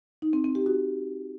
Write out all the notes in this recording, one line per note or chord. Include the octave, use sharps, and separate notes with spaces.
D#4
C4
C4
G4
F#4